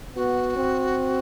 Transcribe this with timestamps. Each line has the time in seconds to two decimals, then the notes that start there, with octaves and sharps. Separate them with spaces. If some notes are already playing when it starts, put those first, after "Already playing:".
0.15 B3 F#4
0.57 C4